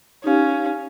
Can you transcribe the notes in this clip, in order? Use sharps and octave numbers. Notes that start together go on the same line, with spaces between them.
C#4 D#4 G4 F5